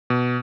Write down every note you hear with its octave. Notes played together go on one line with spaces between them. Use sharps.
B2